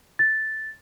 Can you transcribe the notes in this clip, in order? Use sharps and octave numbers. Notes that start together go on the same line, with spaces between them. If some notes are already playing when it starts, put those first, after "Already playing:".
A6